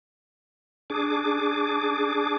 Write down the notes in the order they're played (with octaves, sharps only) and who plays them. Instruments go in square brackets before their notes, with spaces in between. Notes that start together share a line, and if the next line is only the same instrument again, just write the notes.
[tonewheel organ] D4 G#4 D6